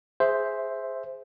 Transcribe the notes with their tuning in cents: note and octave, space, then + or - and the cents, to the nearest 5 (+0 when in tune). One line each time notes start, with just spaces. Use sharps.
G#4 +0 C5 +0 E5 +0